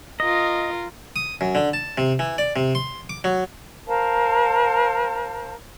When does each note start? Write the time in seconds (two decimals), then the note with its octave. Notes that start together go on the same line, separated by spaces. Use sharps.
0.20 F4 A#4 D#5
1.16 D#6
1.41 F#2
1.55 D3
1.73 A5
1.98 C3
2.19 E3
2.38 D5
2.56 C3
2.75 C6
3.09 D6
3.24 F#3
3.86 A#4 C5 F5 A5